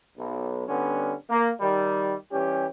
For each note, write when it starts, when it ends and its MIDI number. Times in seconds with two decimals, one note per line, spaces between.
0.16 0.65 35
0.67 1.13 50
0.67 1.13 55
0.67 1.13 59
0.67 1.13 61
1.30 1.50 58
1.60 2.14 51
1.60 2.14 55
2.31 2.66 52
2.31 2.66 55
2.31 2.66 61
2.31 2.66 67